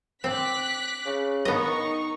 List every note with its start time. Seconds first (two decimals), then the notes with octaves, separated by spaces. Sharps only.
0.24 C4 D6 F#6 B6
1.06 C#3
1.45 D#3 B3 D#4 D#5 C#6